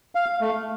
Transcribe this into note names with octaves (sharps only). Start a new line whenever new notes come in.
F5
A3